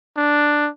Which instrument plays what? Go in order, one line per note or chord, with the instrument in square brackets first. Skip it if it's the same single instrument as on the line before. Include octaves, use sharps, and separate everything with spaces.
[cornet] D4